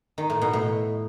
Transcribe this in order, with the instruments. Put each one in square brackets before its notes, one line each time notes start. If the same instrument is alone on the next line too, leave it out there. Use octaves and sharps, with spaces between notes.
[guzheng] D#3
A2
B2
A2